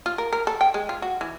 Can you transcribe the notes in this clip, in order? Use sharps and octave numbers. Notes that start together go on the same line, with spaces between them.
F4
A#4
A#4
A4
G5
G#3
F4
F#4
E3